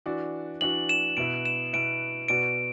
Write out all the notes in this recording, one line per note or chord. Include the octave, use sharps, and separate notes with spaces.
E3 D4 F#4 D5
E3 D4 F#4 D5 F#7
E7
B2 B3 E4 B4 D7
E7
B2 B3 E4 B4 D7
B2 B3 F#4 D5 D7